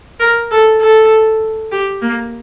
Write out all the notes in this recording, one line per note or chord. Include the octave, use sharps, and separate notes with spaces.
A#4
A4
A4
G4
A#3